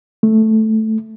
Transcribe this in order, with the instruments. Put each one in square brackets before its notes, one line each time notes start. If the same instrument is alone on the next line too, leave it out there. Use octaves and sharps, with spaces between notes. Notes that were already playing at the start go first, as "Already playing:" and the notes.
[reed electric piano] A3